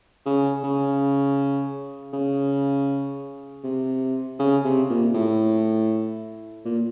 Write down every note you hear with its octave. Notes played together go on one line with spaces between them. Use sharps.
C#3
C#3
C#3
C3
C#3
C3
A#2
A2
A#2